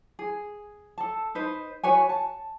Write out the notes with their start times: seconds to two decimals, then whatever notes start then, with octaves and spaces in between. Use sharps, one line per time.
0.19 G#4
0.98 A4 A5
1.35 D#4 B4 C5
1.84 F#4 B4 C#5 G#5
2.09 A5